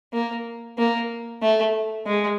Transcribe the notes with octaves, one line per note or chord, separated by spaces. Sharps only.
A#3
A#3
A3
G#3